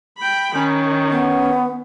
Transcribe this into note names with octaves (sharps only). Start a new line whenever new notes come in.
G5 B5
D#3 C#4
B3